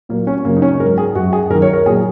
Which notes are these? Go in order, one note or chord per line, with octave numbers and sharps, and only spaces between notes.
A#2 F#3 A#3
C#4
F#2 C#3 F#3 A#3
D#4
C#4
G#2 F#3 A#4
G#4
F#2 F#3 F#4
G#4
F#2 D#3 F#3 A#4
C#5
A#4
A#2 F#3 G#4